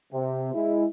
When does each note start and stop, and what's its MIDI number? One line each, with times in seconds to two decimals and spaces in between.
0.13 0.51 48
0.54 0.85 56
0.54 0.85 64